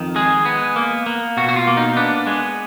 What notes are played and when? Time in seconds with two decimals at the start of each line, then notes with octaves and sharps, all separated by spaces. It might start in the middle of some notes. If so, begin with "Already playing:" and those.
Already playing: F2 D#3
0.16 G#3 G#4
0.45 B3
0.76 A#3
1.06 A#3
1.37 B2 F#4
1.49 F#4
1.56 F4
1.67 A#3
1.77 D#4
1.96 B3 D4
2.27 G#3